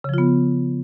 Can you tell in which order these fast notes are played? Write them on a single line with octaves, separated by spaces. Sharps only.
C#3 F3 F4 B3